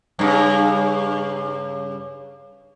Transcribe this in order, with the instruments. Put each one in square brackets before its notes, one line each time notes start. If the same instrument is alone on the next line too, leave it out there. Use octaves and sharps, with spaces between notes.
[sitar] G2 C#3